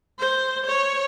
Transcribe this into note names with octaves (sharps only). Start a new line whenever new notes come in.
C5
C#5